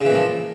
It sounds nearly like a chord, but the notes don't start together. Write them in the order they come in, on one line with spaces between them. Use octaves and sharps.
C#3 E3 A#2 F3